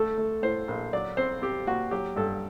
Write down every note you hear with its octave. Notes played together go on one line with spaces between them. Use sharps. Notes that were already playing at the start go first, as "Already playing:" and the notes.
Already playing: D3 A3 A4
A3
A2 C5
A#1
F#3 D5
C4 C5
C4 G4
A#2 F#4
F#3 G4
G2 A4